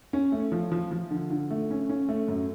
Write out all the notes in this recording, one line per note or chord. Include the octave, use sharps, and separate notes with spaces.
C#4
A3
F3
F3
F3
D3
D3
A3
C#4
C#4
A3
F#2